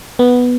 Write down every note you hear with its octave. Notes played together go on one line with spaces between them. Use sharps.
B3